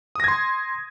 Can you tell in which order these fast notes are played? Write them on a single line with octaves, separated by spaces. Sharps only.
D#6 A#6 G#6 C6